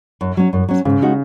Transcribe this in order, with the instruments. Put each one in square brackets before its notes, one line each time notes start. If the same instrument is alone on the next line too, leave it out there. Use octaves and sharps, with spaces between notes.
[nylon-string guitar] F#2
F#3 C#4
F#2
F#3 C#4
[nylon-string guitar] G#2 [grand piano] C#3
[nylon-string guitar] G#3 D#4 F#4